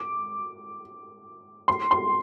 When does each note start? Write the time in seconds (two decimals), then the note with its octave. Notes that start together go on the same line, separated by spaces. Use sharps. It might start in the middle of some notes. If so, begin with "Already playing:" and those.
Already playing: D6
1.68 C6
1.91 C6